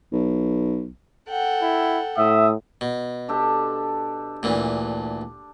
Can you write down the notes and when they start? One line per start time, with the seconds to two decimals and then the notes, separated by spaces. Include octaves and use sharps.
0.12 B1
1.29 A4 F#5 G5
1.63 E4
2.18 A2 E5 D#6
2.81 B2
3.28 D4 G4 A4
4.43 D2 A#2 E3